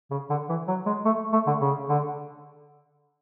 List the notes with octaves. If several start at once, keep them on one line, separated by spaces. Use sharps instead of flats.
C#3
D3
E3
F#3
G#3
A3
A3
D3
C#3
D3